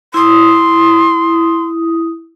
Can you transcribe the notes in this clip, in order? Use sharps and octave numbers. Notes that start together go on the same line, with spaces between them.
E4 C6 D#6